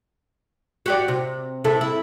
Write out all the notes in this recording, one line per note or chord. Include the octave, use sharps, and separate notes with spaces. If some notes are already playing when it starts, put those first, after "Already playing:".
F#4 G4 D5
C3
C3 E4 A4
E4